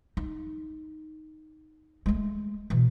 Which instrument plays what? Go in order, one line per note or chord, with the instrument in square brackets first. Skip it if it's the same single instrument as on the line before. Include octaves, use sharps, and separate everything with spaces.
[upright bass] D#4
G#3 A3
B2 E3